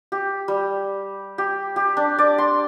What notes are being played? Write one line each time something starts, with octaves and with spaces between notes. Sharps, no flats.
G4
G3
G4
G4
D4
D5
C6